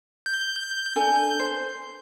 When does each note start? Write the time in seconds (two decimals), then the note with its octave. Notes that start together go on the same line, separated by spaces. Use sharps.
0.26 G6
0.96 D4 A4 G#5
1.39 C5